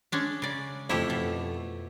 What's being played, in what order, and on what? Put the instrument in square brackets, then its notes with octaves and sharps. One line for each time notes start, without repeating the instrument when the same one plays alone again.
[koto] G#3 C#4 D4
C#3 D5
[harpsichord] F2 A3 [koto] E4 G4
[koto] B2